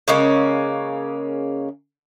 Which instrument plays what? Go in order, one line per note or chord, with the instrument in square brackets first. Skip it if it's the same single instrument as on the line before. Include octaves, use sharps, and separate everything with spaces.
[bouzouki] C#3 G#3 A#3 C#4